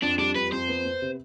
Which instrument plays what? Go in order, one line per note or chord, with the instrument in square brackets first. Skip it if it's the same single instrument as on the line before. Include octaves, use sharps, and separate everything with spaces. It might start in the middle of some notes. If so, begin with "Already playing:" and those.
[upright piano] F2 [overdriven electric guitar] D4
[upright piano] G3 [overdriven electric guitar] D4
[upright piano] F2 [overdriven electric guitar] B4
[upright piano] F2 [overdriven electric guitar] C5
[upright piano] B3
B3
C3